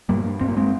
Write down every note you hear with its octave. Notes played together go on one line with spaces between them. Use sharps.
G2 G3 A#3
G2
G2 C4
A#3
G#3 C4